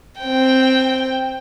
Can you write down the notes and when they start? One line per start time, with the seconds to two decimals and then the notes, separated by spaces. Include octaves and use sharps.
0.20 C4 G5